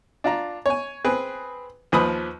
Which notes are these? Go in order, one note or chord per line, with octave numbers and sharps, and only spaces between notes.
D4 F4 A#5
C#5 G#5
C4 G#4 B4
D#2 F3 B4 B5 D#6